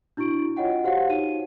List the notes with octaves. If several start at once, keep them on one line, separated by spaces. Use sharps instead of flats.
D4 E4 F#4 C#6 D7
F4 C#5 D#5 F#5 G5
F#4 G4 C5 C#5 F5 F#5
D#4 D#7